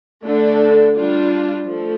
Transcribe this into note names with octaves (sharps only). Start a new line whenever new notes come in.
D3 A3 D4 A4
G3 D4 F4
F3 A3